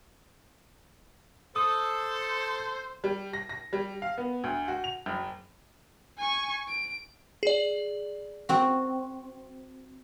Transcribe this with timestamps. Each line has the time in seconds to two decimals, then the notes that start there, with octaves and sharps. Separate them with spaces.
1.56 A4 C5 D#6
3.04 G3
3.33 A#6
3.49 A#6
3.73 G3
4.02 F5
4.18 B3
4.44 D2
4.68 F#4
4.84 F7
5.06 F#1
6.18 G#5 C#6
6.68 D7
7.43 G#4 D5
8.49 C4 F#4